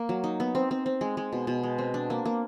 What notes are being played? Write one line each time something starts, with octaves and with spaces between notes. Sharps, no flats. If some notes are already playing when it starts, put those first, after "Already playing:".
Already playing: A#3
F#3
D#4
B3
C4
C4
C4
G#3
G#3
B2
B2
G#3
C4
D4
A#3
A#3